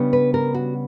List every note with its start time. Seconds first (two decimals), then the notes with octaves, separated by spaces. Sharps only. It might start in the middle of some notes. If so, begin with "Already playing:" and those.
Already playing: C#3 G3 B3 D4
0.13 B4
0.34 A#4
0.54 F#4